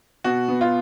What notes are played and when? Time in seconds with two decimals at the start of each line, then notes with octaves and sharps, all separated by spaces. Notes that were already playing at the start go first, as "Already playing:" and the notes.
0.24 B2 F#4
0.48 B3
0.61 F4